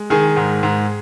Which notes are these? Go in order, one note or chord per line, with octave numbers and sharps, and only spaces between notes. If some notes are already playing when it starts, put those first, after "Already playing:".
Already playing: G#3
D#3 G#4
G#2
G#2